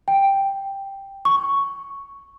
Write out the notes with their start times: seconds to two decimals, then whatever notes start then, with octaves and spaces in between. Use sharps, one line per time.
0.08 G5
1.25 C#6